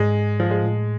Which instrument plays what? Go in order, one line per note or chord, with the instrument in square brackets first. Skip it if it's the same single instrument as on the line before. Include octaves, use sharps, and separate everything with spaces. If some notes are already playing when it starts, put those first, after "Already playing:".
Already playing: [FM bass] G#2 [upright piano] G#3
[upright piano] F3
G#3
[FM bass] A2